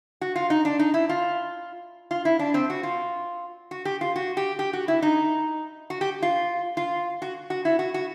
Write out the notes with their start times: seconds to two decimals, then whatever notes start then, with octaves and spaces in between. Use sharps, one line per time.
0.21 F#4
0.36 F4
0.50 D#4
0.65 D4
0.79 D#4
0.94 E4
1.09 F4
2.11 F4
2.25 E4
2.39 D4
2.54 C4
2.70 F#4
2.83 F4
3.71 F#4
3.85 G4
4.01 F4
4.16 F#4
4.37 G4
4.59 G4
4.73 F#4
4.88 E4
5.02 D#4
5.90 F#4
6.01 G4
6.22 F4
6.77 F4
7.22 F#4
7.50 F#4
7.65 E4
7.79 F#4
7.94 F#4